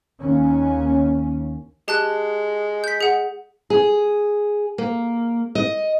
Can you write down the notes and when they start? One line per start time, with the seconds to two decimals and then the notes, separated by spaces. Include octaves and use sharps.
0.20 D#2 C#4
1.88 G#3 G4 A5 F#6
2.84 G6 B6
3.01 G#4 F#5
3.70 G#4
4.78 A#3
5.55 D#5